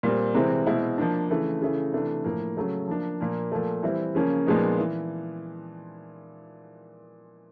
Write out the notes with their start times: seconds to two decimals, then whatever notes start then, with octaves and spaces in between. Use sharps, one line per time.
0.03 A#2 G3 C4
0.35 C3 E3 G#3 C4
0.66 B2 G#3 C4 E4
0.98 F3 A#3 D4
1.30 C#3 E3 A3
1.62 C#3 E3 A3
1.93 C3 E3 A3 D4
2.24 A2 F3 A#3
2.57 C#3 F#3 A3
2.88 F3 A#3 D4
3.20 A#2 F3 A#3
3.52 A#2 F3 A3
3.83 E3 G3 C4 E4
4.15 C#3 F3 A#3 C#4
4.46 A#2 F3 G#3 B3 D#4
4.78 E3